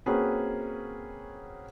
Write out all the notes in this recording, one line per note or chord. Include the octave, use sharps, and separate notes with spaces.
A#3 C4 C#4 F#4 G#4 B4